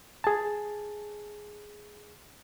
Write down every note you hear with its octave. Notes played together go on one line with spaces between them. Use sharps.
G#4 A5